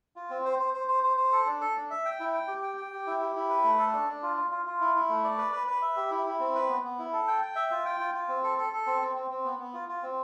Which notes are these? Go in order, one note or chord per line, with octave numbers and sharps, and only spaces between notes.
F4
C4
C5
C5
C5
C5
C5
C5
A4
D4
A4
D4
E5
G5
E4
G5
G4
G5
G5
G4
E4
G4
E4
B4
A3
A4
D4
D4
F4
F4
F4
F4
E4
E4
A3
D5
B4
B4
B4
E5
G4
E4
E4
C4
B4
B3
B3
E4
A4
G5
G5
E5
F4
G5
F4
F4
C4
A4
A4
A4
C4
C4
C4
C4
B3
B3
F4
F4
C4